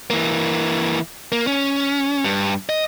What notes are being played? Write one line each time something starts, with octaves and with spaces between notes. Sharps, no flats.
E3 A#3
A#3
C#4
G2
D#5